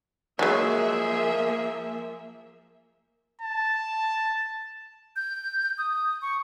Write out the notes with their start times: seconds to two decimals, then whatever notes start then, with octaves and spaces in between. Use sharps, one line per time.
0.39 F3 F#3 G#3 A#3 G#4 E5
3.42 A5
5.16 G6
5.78 D#6
6.22 C#6